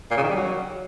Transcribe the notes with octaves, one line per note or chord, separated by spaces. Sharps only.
A#2
C#3
D#3
G3
F#3